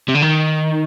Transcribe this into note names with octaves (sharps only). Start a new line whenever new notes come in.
C3
D3
D#3